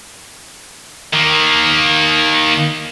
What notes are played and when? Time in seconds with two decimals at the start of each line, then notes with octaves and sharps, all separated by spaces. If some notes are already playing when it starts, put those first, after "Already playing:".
1.13 D#3 A#3